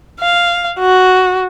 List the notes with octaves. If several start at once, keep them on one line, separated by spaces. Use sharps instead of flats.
F5
F#4